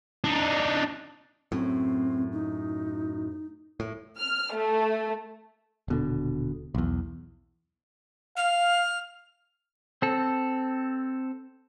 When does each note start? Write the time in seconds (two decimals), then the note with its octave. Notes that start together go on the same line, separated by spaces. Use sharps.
0.24 D4 D#4
1.52 F#2 A2 C4
2.32 D#4
3.80 A2
4.19 F6
4.54 A3
5.88 D#1 B2 D3
6.75 B1 E2
8.37 F5 F6
10.02 C4 A4